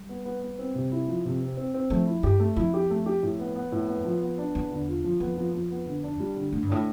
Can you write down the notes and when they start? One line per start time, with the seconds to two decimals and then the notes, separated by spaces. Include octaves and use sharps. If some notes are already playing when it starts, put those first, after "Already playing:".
Already playing: G3
0.09 B3
0.25 B3
0.43 B3
0.59 C4
0.75 C3
0.92 E4
1.08 F3
1.25 C3
1.41 C4
1.57 C4
1.74 C4
1.90 F3 A3
2.07 E4
2.23 G2 G4
2.40 A3
2.56 F2 E4
2.74 G4
2.90 A3
3.06 G4
3.23 A2
3.40 B3
3.56 B3
3.72 A2
3.88 B3
4.05 F3
4.22 B3
4.38 D4
4.55 E2 B3
4.71 D3
4.88 F4
5.04 F3
5.20 F2 B3
5.37 F3
5.54 F3
5.71 B3
5.86 D3
6.03 D4
6.20 G3
6.37 D3
6.52 A2 D3
6.62 G2
6.69 A2 D4